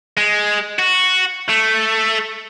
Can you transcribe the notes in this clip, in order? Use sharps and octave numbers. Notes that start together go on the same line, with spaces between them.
G#3
F#4
A3